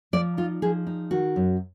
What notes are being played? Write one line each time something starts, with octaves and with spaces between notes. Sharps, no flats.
F3 D5
D#4 F4
F3 G#4
D#4
D#3 F#4
F#2